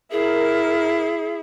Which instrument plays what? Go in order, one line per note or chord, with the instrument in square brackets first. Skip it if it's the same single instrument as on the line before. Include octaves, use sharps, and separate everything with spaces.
[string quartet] E4 [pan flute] G#4 [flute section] A#4